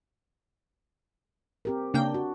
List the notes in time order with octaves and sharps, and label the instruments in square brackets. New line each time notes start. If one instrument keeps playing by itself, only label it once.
[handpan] C4 G4 A#4
[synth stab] C#3 A#3 G5 [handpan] D4
[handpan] F#4